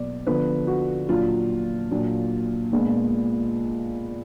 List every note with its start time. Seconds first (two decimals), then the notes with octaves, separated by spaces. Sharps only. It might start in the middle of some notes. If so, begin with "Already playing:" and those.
Already playing: B2 F#3 A#3 D5
0.26 D3 F3 B3 D4 B4
0.67 F#4
1.09 A#2 F#3 D4 F4
1.91 A#2 F#3 D4
2.73 A#2 G#3 B3 D4